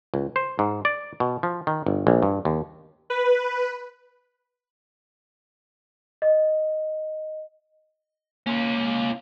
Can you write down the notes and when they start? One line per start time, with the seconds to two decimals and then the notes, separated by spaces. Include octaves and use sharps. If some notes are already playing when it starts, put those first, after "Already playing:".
0.14 C#2
0.36 C5
0.59 G#2
0.85 D5
1.20 B2
1.43 F3
1.67 D#3
1.86 G1
2.07 A#1
2.22 G2
2.45 D#2
3.10 B4
6.22 D#5
8.47 A#3 C#4 F4